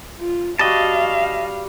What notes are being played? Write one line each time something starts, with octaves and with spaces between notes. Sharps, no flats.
F4
G3 F#4 D#5 F5 A5